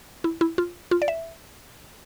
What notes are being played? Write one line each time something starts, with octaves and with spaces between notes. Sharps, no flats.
E4
E4
F4
F4
D5
E5